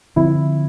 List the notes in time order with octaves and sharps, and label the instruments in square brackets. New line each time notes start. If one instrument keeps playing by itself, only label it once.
[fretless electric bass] D3 F3 C4 [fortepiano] E4